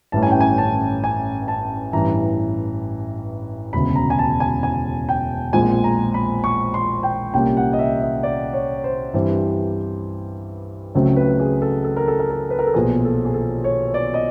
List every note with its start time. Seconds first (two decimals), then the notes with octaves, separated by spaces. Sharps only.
0.12 A1 G2 E3 A3 C#4 A5
0.23 G#5
0.31 G5
0.41 G#5
0.58 A5
1.04 G#5
1.48 A5
1.93 A1 G2 E3 A#5
3.73 E1 D2 C#3 B5
3.96 A#5
4.10 G#5
4.19 A5
4.40 G#5
4.63 G#5
5.09 G5
5.53 A#1 A#2 F3 G#3 C4 G#5
5.84 A#5
6.14 B5
6.44 C#6
6.74 C6
7.03 G5
7.34 C2 A#2 G3 A#3 C#4 G5
7.57 F#5
7.73 D#5
7.79 E5
8.02 D#5
8.23 D5
8.53 C#5
8.84 C5
9.14 G2 E3 G3 C4
10.95 C#2 C#3 F#3 A3 C4
11.16 B4
11.40 G#4
11.62 A4
11.84 A4
11.97 A#4
12.08 A4
12.19 A#4
12.30 A4
12.50 B4
12.59 A#4
12.67 A4
12.74 B1 A#2 F3 G#4
13.05 A4
13.25 G#4
13.34 A4
13.64 C#5
13.94 D5
14.14 D#5